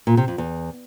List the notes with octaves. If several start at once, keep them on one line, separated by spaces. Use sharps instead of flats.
A#2
C3
F2
E2